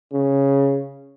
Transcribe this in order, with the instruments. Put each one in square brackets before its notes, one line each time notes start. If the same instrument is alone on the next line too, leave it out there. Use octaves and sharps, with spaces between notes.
[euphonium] C#3